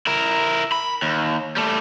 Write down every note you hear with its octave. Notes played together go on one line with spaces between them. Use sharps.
E4 A#4
B5
D#2
G3 A3